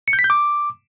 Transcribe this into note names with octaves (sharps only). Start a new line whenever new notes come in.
C#7
G6
B6
G6
D6